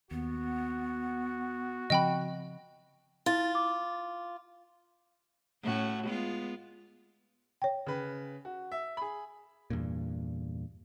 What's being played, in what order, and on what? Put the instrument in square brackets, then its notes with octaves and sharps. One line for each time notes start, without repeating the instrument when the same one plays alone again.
[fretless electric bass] D#2 [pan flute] B3 [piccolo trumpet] F#4
[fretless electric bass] C#3 F3 C4 [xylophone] D#5 G5 B5
[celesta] E4 A6 [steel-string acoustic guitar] F4
[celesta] D6
[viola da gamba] A2 C#4 F#4
G#3 B3 F4
[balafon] C#5 G5
[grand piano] C#3 B4
F#4
E5
G#4 B5
[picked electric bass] E2 G2 A#2